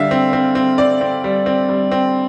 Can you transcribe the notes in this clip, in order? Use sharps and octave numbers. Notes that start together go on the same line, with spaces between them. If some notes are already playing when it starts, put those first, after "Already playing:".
Already playing: D3 G3 E5 F5
C4
C4
C4
C4 D5
C4
G3
C4
G3
C4